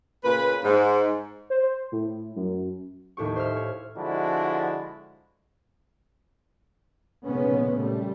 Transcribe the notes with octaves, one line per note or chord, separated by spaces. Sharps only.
A#2 C#3 B4
G#2
C5
A2
F#2
D#2 A2 G4 C#6
C5 E5 F6
C#5
D3 F3 G#3 D4 E4 F#4
F1 A#2 C#3 G#3 B3 C#4
A#2 G3 A3